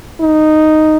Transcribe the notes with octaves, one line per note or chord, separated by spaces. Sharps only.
D#4